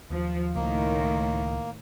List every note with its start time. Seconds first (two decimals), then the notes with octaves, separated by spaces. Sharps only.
0.10 D#2 F3
0.55 C#2 A2 D#3 A#3